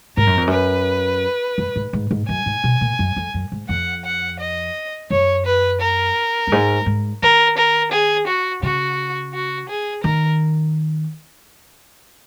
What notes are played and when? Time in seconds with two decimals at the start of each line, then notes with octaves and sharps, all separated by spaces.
0.17 G#2 A#4
0.27 F#2
0.37 F2
0.47 F#2 B4
1.58 F#2
1.76 G#2
1.93 G#2
2.11 G#2
2.29 F#2 G#5
2.46 G#2
2.64 B2
2.81 A#2
2.99 F#2
3.16 F2
3.34 F#2
3.52 G#2
3.69 F2 F#5
4.05 F#5
4.39 D#5
5.10 F#2 C#5
5.46 B4
5.80 A#4
6.47 F#2
6.52 G#2
6.86 G#2
7.22 D#3 A#4
7.57 A#4
7.92 G#4
8.27 F#4
8.63 C#3 F#4
9.33 F#4
9.69 G#4
10.03 D#3 A#4